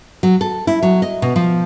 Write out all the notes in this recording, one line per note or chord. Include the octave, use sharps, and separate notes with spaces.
F#3
A4
E4
F#3
D#5
B2
F3